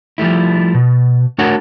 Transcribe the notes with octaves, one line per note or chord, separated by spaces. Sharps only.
F3 G3 A3 E4
B2
A3 D4 F#4 A#4 C#5 F#5